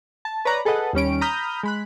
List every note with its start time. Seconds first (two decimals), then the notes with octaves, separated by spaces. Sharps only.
0.25 A5
0.45 B4 C#5 D5 A#5 F#6
0.65 G#4 A4 B4 D#5 F#5
0.93 D#2 G3 C#4 D7
1.21 A#5 B5 D#6 F6 G6
1.63 G#3 B5 F#6